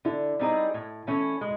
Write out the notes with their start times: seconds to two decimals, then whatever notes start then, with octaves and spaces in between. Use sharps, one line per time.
0.05 D3 E4
0.39 G3 C4 D#4 G#4
0.74 A2
1.07 E3 A3 C#4
1.41 G#3